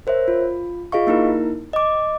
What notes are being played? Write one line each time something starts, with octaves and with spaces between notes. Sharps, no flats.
A#4 C5 C#5 E5
F4
F4 G#4 D#5 F5 C#6
A#3 D#4 E4 A#4
D#5 D6